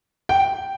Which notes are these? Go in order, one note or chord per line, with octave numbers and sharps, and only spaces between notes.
G5